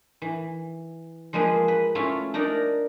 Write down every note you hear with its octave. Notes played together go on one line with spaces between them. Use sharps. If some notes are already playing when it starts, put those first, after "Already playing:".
E3
F3 G#3 A#3 G#4 B4
B4
A3 C#4 E4 F4
D4 D#4 A#4 D5